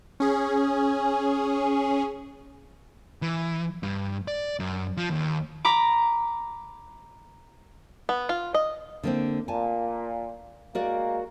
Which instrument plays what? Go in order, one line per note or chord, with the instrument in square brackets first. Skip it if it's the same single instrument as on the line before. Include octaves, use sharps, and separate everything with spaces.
[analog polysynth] C#4 G#4
[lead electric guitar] E3
G2
D5
F#2
F3
D#2
[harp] A#5 B5 D6
[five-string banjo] B3
F4
D#5
[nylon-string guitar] D3 A#3 C4
[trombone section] A#2 [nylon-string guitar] G#5 A5
[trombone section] G#3 A#3 [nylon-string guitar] F#4 A#4 D5